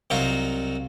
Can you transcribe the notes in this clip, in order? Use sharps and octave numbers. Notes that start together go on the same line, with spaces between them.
C2 F#3 D#4 F4 F#4